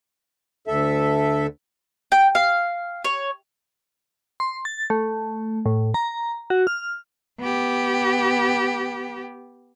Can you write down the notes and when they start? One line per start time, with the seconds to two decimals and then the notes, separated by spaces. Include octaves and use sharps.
0.67 D2 A4 E5
2.12 G5
2.35 F5
3.05 C#5
4.40 C6
4.65 A6
4.90 A3
5.66 A2
5.94 A#5
6.50 F#4
6.67 F6
7.40 B3 G4